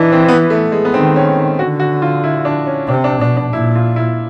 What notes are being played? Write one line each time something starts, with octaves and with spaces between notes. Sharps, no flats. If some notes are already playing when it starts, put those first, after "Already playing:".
Already playing: E3 D4 D#4
C4
B3
A3
G#3
B3
D#3 C4
C#4
D3 F#4
F#4
F4
E4
D4
C#4
C3 D4
D4
B2 D4
D4
A#2 E4
F4
E4